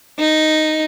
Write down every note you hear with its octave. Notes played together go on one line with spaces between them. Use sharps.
D#4